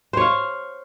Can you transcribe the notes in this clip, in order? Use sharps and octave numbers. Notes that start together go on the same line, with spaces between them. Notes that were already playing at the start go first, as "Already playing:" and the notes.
C5 C#5 F5